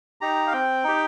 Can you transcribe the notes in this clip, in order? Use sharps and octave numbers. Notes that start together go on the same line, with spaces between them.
D#4 G4 A#5
F5
C4 G5
D#4 G4